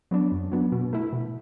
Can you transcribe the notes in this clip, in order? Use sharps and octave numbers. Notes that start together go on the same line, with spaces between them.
F#3 B3 D4
F#2
F#3 B3 D4
B2
A3 E4
B2